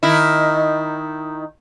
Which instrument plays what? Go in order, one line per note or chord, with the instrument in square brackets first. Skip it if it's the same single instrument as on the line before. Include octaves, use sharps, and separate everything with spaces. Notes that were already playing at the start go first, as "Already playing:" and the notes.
[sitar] D#3 E4